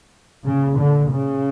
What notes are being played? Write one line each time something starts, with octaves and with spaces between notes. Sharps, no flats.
A#2 C#3
D3
C#3